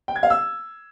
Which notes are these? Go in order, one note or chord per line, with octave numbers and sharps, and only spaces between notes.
G5
G#6
F5
E6